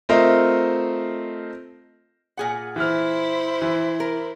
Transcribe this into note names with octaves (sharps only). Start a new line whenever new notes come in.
A3 C4 F4 A#4 C5 D#5
A#2 G#4 F#5
E3 E4 C5 F6
E3
A#4